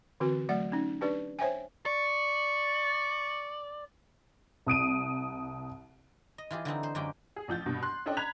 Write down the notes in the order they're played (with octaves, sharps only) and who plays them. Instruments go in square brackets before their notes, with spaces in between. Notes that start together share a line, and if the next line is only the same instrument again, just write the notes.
[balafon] D3 E3 C4 F#4 B4
F#3 A3 D5 F#5
C#4 D#4
D4 G4 B4 D5
C5 C#5 E5 G5 G#5
[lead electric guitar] D5 [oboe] C#6
[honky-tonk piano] C2 D#6 D7 D#7
[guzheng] D#5
E3 F4 G4 G#4
D3 E3 C4 D#4
C5
F#2 D3 G#3 A#3 G4 G5
[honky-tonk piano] G#4
A1 F3 G6 A6
G2 B2
C6 F#6
C#4 D4 A4 D5 D#5 G5
A#5 B5 F#6 G#6 B6 F7